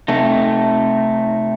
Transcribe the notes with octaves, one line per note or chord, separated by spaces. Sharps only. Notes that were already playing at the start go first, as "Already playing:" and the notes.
C3 A3 D#4